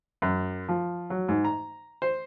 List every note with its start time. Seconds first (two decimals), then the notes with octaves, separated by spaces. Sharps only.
0.22 F#2
0.69 F3
1.10 F#3
1.29 G#2
1.45 A#5
2.02 C5